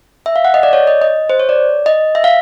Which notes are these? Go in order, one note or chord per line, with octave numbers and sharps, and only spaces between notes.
E5
F5
F#5
D#5
D5
C#5
D#5
D#5
C5
C#5
D5
D#5
E5
F5